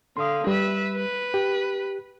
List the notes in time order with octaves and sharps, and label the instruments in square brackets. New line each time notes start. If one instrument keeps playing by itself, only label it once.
[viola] D3 F5 [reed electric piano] C6 D#6
[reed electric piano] G3 [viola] B4 E5
[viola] B4
[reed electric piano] G4